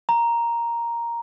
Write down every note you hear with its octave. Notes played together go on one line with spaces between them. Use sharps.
A#5